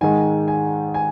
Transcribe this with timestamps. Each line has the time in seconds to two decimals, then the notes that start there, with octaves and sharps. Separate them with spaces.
0.01 G#2 D#3 G#3 D#4 G#5
0.48 G#5
0.94 G#5